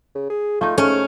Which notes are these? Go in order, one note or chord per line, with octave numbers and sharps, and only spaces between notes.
C#3
G#4
A3 D#4 F4
G#2 A3 C#4